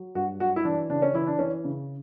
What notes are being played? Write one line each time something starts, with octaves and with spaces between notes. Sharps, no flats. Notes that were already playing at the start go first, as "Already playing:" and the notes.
Already playing: F#3
G2 F#4
F#3 F#4
E4
E3 D4
C#3 D4
C#4
E3 E4
D4
E3 C#4
C#3